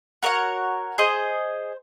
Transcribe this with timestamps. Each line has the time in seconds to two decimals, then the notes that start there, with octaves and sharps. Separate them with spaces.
0.23 F#4 A#4 C#5 F#5
0.98 G#4 C5 D#5